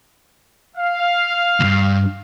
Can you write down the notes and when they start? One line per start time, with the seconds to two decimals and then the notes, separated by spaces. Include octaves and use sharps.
0.77 F5
1.60 D2 G2